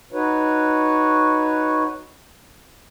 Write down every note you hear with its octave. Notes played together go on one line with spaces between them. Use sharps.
D#4 F#4 B4 C#5